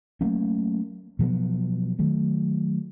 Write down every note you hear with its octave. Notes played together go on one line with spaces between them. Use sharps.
F#3 A3 A#3 C#4
B2 F3 F#3 B3
D#3 F#3 A3